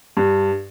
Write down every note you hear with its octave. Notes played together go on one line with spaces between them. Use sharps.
G2